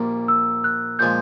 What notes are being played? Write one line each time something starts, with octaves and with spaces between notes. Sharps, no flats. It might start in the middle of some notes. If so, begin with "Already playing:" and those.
Already playing: A#1 A#2 G3 A#3 A#5
E6
F#6
A#2 F3 G#3 G6